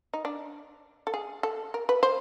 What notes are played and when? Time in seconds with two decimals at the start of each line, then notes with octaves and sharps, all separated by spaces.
0.14 D#4
0.25 D4
1.07 A4
1.14 G#4
1.43 A4
1.74 A#4
1.89 B4
2.03 C5